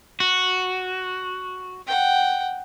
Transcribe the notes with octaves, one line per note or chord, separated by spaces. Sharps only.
F#4
F#5 G5